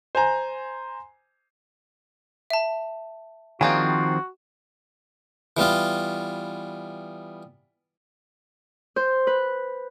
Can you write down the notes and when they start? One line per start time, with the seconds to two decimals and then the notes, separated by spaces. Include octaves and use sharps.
0.15 C5 G#5 A#5
2.50 E5 A5
3.61 D#3 F3 A#3 C4 D4 F#4 G#4
5.57 E3 G3 B3 F4
8.96 C5
9.27 B4